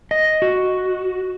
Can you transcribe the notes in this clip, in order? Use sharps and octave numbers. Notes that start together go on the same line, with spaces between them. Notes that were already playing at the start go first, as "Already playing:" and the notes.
D#5
F#4